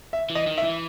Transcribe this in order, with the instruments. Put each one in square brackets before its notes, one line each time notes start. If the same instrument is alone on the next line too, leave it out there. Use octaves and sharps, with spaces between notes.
[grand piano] E5
[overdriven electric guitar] E3
[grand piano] D#5
[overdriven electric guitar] D#3
[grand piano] E5
[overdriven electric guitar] E3